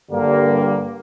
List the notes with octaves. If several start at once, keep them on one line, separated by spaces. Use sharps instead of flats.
G2 D3 G3 A#3